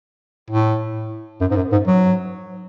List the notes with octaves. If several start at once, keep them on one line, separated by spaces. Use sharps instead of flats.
A2
F#2
G#2
F#2
G#2
F#3